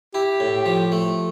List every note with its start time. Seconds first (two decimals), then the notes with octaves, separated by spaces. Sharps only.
0.14 E4 G4
0.40 A2
0.66 F3
0.92 A3